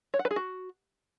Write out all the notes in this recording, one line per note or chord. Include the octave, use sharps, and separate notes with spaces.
C#5
F#5
B4
G#4
F#4